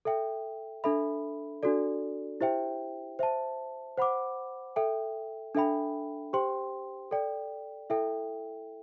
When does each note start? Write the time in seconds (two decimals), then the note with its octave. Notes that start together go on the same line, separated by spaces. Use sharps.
0.05 A4 E5 G5
0.84 D4 A4 E5 B5
1.63 D4 F#4 A4 D5
2.41 E4 G4 C5 E5 G5
3.19 C5 E5 A5
3.98 C5 F#5 B5 D6
4.76 A4 E5 G5
5.55 D4 A4 E5 G5 B5
6.33 G4 C5 G5 C6
7.11 A4 D5 G5
7.90 E4 A4 E5 G5